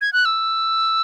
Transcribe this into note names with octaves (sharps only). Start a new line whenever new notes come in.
G#6
F#6
E6